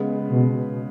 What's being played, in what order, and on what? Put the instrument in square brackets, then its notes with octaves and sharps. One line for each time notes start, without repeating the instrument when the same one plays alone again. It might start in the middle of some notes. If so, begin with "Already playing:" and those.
Already playing: [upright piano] C#3 G#3 B3
[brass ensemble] B2